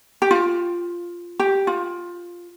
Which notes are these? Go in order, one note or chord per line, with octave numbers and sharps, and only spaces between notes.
G4
F4
G4
F4